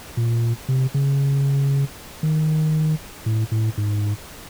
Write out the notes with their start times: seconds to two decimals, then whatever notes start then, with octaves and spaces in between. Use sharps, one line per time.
0.17 A#2
0.68 C3
0.94 C#3
2.23 D#3
3.26 A2
3.51 A2
3.77 G#2